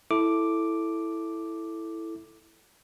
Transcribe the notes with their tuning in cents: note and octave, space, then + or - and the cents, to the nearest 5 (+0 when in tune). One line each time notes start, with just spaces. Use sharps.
E4 +0 A4 +0 D6 +0